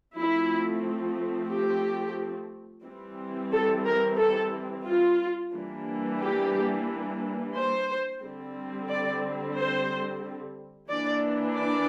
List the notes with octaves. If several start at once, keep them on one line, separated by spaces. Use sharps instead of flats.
F3 A3 C4 E4
G4
E3 G3 C4
A4
A#4
A4
F4
E3 G3 A#3 D4
G4
C5
D3 G3 C4
D5
C5
E3 A#3 D4 D5
D5